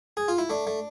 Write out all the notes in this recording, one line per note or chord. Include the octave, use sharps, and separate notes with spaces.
G#4
F4
E4
A3 D4
A3